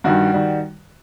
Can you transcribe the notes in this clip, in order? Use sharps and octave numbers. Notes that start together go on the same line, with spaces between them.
G2 D#3 G3 F#4
D#3 G3